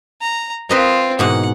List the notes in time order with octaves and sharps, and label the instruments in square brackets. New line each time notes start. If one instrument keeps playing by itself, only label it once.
[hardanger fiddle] A#5
[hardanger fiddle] C4 F4 [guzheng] B4 D#5 A#5
[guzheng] G#2 B2 E3 [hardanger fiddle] F#5